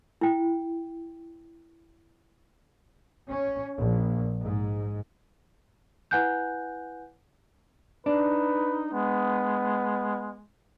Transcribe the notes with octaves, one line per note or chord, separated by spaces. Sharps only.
E4 G5
C#4
A#1
G#2
E4 B4 F#5 G#5 F#6 G6
D4 D#4 B4
G#3 B3